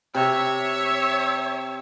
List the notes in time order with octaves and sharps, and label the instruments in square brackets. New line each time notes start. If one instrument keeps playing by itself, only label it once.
[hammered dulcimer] C3 [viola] C#5 E5